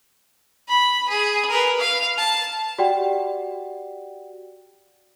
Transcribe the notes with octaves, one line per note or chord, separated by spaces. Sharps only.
B5
G#4
A#4 B4
F5
A5
F#4 G4 D5 F#5 G5